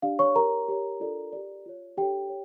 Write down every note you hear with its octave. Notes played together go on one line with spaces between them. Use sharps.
D4 G4 D5 F5
C#5 C#6
G4 A#4 C#5 A#5
G4 C#5
D4 F4 A4 D5
G4 D5
F4 C#5
D4 G4 A4 C#5 G5
C#5